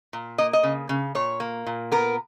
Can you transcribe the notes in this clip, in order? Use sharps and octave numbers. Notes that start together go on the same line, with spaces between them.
A#2
A#3 D#5
D#5
C#3
C#3
A#2 C#5
A#3
A#2
B3 A#4